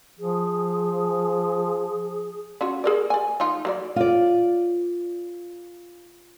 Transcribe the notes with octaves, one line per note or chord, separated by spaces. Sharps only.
F3 G#4
C#4 F4 F#4
G#4 A#4 D5
D5 G#5
F3 D#4 F4
F#3 F4 D5
F4 D5